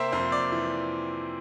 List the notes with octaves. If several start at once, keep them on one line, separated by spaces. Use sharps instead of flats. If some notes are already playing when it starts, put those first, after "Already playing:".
Already playing: C3 A#3 C5 E5 G5 A#5
F2 C5
D5
E3